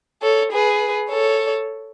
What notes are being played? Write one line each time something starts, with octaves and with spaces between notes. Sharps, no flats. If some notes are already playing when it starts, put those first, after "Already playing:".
A4 C#5
G#4 B4
A4 C#5